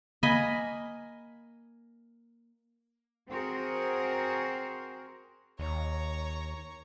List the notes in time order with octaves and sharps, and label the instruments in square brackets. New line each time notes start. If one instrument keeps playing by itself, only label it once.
[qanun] A#3 D#5 G#5 B5
[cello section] C4 F#4 G#4 A#4 C5
[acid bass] D#2 [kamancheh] C#5 A#5